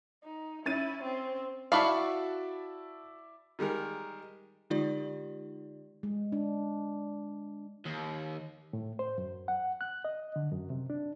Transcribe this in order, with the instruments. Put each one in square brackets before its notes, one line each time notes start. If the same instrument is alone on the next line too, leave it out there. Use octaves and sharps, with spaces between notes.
[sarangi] D#4
[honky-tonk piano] C#4 A6 D#7 [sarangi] E4
[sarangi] C4
[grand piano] E4 D5 E5 [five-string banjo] F#4 F5 [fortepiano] A5 B5 C#6
[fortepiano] D#3 G3 G#3 A#4
[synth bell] D3 G#3 D#4 F4 G4 D5
[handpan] G#3
D4
[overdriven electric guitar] D#2
[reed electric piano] A2
C5
F#2
F#5
F#6
D#5
D3
F#2
C3
D4